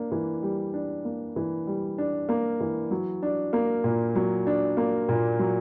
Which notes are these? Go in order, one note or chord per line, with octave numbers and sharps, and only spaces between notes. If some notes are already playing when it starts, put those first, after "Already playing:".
Already playing: A#3 D4
E3
G3
D4
A#3
E3
G3
D4
A#3
E3
F#3
D4
A#3
A#2
F#3
D4
A#3
A#2
F#3